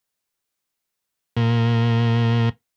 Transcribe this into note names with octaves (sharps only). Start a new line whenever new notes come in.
A#2